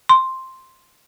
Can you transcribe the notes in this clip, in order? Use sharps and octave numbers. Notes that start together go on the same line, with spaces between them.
C6